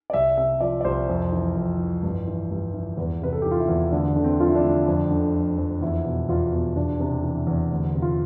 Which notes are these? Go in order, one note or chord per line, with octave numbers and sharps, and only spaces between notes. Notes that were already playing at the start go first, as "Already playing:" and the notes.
D5
C2 E5
C3 E5
F3 D5
D5
C2 C5
F2
E3
F2
E3
G2
E3
G2
E3
E2 B4
C3 B4
A4
E3 G4
F4
E4
E2
D2 D4
D3
C4
F3 F4
E4
D4
D2
F2
D3
F3
F2
E2 E4
B2
E2 F4
B2
E2 D4
C3
E3
E2
D2
C3
F4